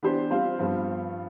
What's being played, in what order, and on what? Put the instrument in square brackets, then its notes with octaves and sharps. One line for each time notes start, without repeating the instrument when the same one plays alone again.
[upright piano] E3 B3 D4 G4 C5
G3 C4 F4 C5 F5
G2 F3 B3